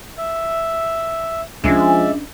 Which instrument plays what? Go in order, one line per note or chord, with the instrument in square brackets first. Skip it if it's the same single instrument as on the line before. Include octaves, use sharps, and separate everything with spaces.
[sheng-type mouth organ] E5
[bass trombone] F3 [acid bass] G#3 [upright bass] C#4 D4 [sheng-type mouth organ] D5 E5